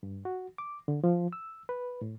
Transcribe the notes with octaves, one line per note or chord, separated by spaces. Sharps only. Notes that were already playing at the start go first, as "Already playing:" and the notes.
G2
F#4
D6
D3
F3
E6
B4
A2